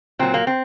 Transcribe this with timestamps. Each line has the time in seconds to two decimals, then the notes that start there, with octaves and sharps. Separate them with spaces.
0.19 A#2 F#3 C4
0.34 A#3
0.47 C4